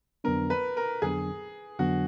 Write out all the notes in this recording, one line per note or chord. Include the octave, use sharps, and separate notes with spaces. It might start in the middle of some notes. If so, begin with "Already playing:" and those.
F2 D3 F#3 B3 D4 A#4
B4
A#4
F2 D3 F#3 B3 D4 G#4
F2 D3 F#3 B3 D4 F#4